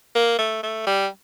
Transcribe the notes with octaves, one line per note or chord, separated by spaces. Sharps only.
A#3
A3
A3
G3